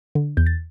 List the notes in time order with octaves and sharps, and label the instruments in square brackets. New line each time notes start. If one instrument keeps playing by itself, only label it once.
[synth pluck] D3
E2 G6
A6